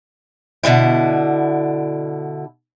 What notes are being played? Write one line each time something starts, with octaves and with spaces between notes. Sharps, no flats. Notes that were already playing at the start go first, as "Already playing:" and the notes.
B2 D3 E3 E4